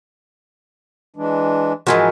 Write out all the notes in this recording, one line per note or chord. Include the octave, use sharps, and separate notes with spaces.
E3 G#3 D4
G#2 E3 F3 F#4 A#4 G#5